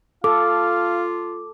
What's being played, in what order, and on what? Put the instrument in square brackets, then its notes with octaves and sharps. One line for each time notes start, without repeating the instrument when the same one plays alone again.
[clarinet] F4 [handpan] A4 [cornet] F5 [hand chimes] D6